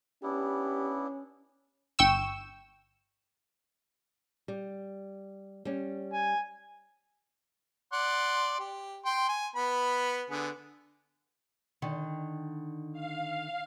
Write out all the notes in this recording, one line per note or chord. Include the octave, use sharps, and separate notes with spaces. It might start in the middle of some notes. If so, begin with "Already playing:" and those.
B3 C#4 D4 E4 G4
G1 G5 C#6 E6 E7
G3
G3 C#4
G#5
D5 F#5 C6
G4
G5 C6
G#5
B3 B5
D3 B3 G#4
D3 D#3
F5